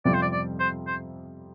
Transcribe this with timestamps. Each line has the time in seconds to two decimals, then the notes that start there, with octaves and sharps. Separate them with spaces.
0.05 F2 C3 G3 C4 F4 D5
0.14 C5
0.22 D5
0.32 D5
0.60 C5
0.87 C5